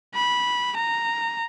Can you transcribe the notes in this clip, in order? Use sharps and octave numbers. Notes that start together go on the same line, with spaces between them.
B5
A#5